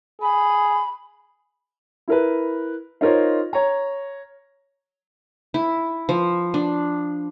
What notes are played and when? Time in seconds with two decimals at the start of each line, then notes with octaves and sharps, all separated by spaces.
0.22 G#4 B5
2.08 E4 A#4 B4
3.01 D#4 F4 A#4 C5 C#5
3.53 C#5 A#5
5.54 E4
6.09 F3
6.54 D4